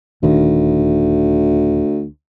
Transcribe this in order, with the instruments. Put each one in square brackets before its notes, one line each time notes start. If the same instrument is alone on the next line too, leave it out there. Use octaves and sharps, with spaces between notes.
[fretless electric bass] D#1 D#3 [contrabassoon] D2